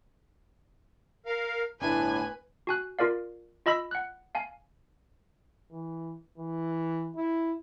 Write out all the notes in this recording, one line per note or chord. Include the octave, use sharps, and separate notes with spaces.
A#4 F5
G1 A2 D4 E4 B4 G#5
F#4 G#5 F#6
F4 A#4 D5 F5
F4 D#5 B5 E6 B6
F#5 F#6
F5 G#5
E3
E3
E4